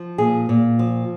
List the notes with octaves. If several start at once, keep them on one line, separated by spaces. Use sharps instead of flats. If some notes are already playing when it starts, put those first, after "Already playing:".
Already playing: F3
A#2 G#4
A#2
F3